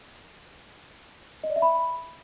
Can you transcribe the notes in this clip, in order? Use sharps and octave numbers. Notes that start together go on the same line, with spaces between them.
D#5
D5
E5
B5